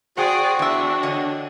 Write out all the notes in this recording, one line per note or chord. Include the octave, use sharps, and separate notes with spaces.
F#4 G#4 C5 D5 F#5 G5 D#6
E2 D4 E5
D3 C#5 D#5